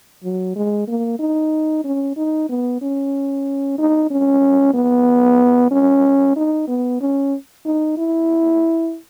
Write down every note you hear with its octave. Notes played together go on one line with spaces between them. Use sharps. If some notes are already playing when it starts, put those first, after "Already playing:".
F#3
G#3
A#3
D#4
C#4
D#4
B3
C#4
D#4
C#4
B3
C#4
D#4
B3
C#4
D#4
E4